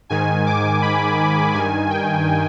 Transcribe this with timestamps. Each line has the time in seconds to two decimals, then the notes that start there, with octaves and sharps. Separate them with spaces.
0.10 G#2 D#3 G#5
0.46 D6
0.82 B5
1.54 G2 D#3 G#5
1.90 G5